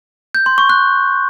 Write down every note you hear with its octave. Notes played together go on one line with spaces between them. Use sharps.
G6
C6
C#6
F#6